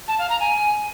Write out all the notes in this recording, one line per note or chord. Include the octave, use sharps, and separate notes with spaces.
A5
F5
A#5
G#5